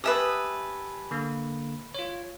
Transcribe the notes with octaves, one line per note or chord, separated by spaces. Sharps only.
G4 B4 E5 G#5 A5 D#6
D3 A#3
F4 C#5